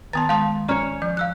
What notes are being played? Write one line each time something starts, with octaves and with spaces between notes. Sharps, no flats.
D#3 B3 A5 C6 D#6 A6
G#3 F5 A5 C6 D#6
C#4 C#5 D5 A#5 F6
F3 G6
F5 E6 F#6